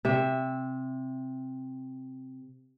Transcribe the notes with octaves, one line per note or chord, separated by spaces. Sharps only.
C3 E5